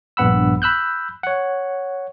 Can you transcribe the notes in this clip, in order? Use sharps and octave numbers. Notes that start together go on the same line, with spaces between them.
A#1 G2 B3 F#5 B5 E6
B5 E6 F#6 G6
C#5 F#5